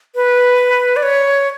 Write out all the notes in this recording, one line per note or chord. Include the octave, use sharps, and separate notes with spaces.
B4
D5
C#5